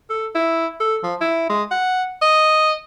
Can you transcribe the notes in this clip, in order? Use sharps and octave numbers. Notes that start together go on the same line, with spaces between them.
A4
E4
A4
F3
E4
G#3
F#5
D#5